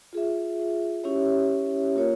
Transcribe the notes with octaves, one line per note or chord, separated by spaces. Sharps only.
F4 G#4 E5
C#4 E4 G4 C#5 E5
A#3 F4 A#4 C#5